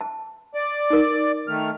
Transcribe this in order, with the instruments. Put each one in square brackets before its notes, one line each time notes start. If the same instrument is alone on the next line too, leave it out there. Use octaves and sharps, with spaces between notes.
[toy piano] A5
[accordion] D5
[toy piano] D#4 A#4
[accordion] D#3 A3 F6